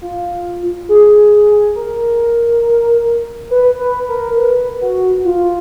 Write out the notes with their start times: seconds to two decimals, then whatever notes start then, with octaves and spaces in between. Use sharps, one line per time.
0.02 F4
0.89 G#4
1.75 A#4
3.51 B4
3.79 B4
4.08 A#4
4.37 B4
4.81 F#4
5.25 F4